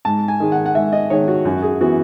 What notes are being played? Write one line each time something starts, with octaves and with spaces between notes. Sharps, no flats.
G#2 A5
G#5
D#3 G#3
F#5
F#5
G#2 E5
D#5
D#3 G#3 C#5
F#4
F#2 F#4
G#4
E3 B3 F#4